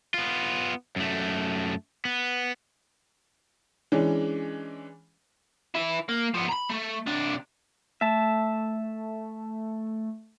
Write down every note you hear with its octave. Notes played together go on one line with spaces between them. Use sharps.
B3 F4
F#2 A3
B3
E3 G#3 C#4 D4
E4 B4
A#3
F3 B3
A#5 B5
A3
C3 D4
A3 E5 A5